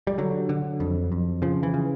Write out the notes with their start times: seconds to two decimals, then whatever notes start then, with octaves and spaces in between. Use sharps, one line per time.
0.07 G3
0.18 D3 F#3
0.49 D3
0.80 F2
1.12 F2
1.42 C#3 F3
1.63 E3
1.74 C#3